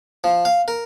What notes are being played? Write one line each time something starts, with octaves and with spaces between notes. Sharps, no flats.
F3
F5
A#4